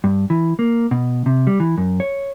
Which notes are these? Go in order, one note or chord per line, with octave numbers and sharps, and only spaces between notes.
G2
E3
A#3
B2
C3
G3
E3
F#2
C#5